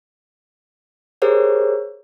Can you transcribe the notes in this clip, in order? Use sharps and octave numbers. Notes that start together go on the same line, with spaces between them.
G4 G#4 A#4 C5 C#5